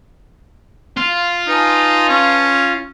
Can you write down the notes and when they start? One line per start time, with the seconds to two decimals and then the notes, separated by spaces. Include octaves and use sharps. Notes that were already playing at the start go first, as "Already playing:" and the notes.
0.97 F4
1.48 D#4 B4 G#5 A5
2.09 C#4